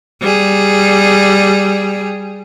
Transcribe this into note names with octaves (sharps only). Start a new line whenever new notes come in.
G3 G#4